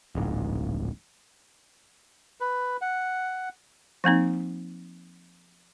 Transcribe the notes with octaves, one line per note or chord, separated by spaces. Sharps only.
D1 A#1 G#2
B4
F#5
F3 A#3 C4 D#4